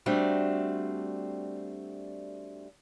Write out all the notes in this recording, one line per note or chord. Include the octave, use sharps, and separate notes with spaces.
G3 A3 C4 D4 F#4